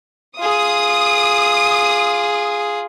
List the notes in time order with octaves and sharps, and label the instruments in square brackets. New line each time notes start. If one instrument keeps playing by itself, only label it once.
[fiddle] F4 G#4 [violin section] D#6